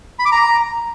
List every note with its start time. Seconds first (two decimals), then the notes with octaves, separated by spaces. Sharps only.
0.19 B5
0.25 D6
0.32 A#5